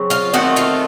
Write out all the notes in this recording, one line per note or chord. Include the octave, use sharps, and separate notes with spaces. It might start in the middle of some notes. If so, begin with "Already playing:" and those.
Already playing: C#3 F#3 C4
F4 F5
D#3 A3 C4 F#4 F#5
F4 F5